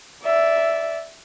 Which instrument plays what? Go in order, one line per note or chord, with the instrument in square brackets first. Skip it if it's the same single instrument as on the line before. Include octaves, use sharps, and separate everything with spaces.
[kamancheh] D5 E5